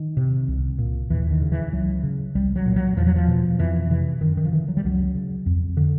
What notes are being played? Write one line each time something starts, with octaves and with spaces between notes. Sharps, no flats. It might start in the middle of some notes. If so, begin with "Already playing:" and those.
Already playing: D#3
C3
C2
A#2
D#2 E3
D#3
C#3
E3
C#2 F#3
C#3
C2 G3
F#3
A#2
F#3
E2 F3
F#3
F3
B2
F2 E3
C3 E3
F#2 D#3
D#3
F3
D3 E3
F#3
G3
C#2 F#3
C#3
F2
D3